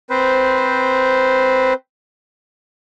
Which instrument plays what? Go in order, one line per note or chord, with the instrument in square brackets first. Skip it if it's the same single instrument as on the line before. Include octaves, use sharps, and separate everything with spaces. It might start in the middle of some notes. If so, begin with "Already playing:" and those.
[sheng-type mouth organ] C4 B4 C5